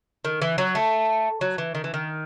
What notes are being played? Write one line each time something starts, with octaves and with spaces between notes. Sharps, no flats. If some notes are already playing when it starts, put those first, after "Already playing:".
D#3
E3
F#3
A3
F#3
E3
D#3
E3
D#3